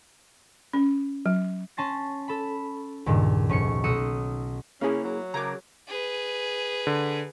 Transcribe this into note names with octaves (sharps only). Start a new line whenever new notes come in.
C#4
F#3
C#4 A5 C6 A#6
A4 B5
C#2 G2 A#2 D#3
F1 C#4 C#6 C#7
B1 D#6 E6 F#6 C#7
C#3 A#3 C#4 E4 G#4
F#3
C#3 G#4 A#4 A#5 D6
G#4 B4
D3